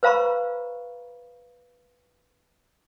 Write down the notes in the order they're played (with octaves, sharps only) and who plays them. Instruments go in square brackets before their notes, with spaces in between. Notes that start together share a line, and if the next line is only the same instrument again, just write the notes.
[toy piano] B4 C5 F5 A#5 B5 C#6